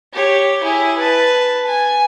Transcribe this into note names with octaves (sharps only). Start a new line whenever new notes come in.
G4 C#5
E4 G#4
B4 A5
G#5